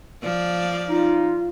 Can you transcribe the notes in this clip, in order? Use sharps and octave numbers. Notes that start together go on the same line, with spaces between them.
F3 D5
D#4 F4